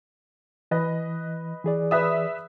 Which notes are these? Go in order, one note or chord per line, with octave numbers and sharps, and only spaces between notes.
E3 B4 D#5
E3 G#4 D5
B4 E5 D#6